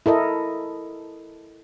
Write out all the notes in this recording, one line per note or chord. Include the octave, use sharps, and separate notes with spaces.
E4 A4 A#4 D#5